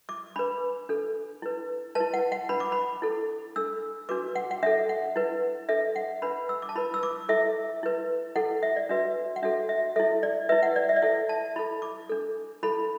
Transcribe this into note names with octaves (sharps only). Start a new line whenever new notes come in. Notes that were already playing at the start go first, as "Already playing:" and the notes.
D6
D4 B4 B5
D4 A4
E4 B4
E4 B4 A5
F#5
F#5
D4 B4 B5
D6
B5
E4 A4
D4 A4 E6
D4 F#4 B4 D6
F#5
F#5
D4 A4 E5
F#5
E4 B4
D4 A4 E5
F#5
D4 B4 B5
E6
D6
A5
E4 B4 B5
E6
D6
E4 A4 E5
E4 B4
E4 A4 F#5
E5
D5
D4 F#4 B4 E5
F#5
D4 F#4 A4 E5
E5
E4 A4 E5
D5
E4 B4 E5
F#5
D5
E5
D5
E4 A4 E5
A5
E4 A4 B5
D6
D4 A4
E4 A4 B5